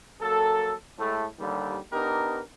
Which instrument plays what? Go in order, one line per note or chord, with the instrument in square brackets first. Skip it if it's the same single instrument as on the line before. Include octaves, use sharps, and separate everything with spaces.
[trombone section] F#3 A#3 A4
A2 G#3 A3
D#2 D3 G3
B3 D4 D#4 G4 A#4